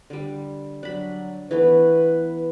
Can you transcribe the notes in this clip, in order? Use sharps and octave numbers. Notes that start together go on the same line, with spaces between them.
D3 G3
F#3 D4 B5
E3 A3 B3 B4